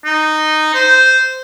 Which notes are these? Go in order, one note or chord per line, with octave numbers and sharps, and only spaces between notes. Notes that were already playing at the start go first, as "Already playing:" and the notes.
D#4
C5